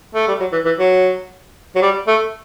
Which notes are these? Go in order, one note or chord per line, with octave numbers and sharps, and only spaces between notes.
A3
G3
F#3
E3
E3
F#3
F#3
G3
A3